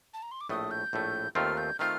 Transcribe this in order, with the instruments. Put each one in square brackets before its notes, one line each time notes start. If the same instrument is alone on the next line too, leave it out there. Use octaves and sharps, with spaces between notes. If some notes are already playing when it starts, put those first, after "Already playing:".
[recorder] A5
A#5
C6
D6
[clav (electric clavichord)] A#1 A2 A3 [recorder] D#6
[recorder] G6
[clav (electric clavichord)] A#1 A2 A3
[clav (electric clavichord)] D#2 D#3 A3 C4 F4 [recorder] F6
[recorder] G6
[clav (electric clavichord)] D#3 A3 C4 F4 [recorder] F6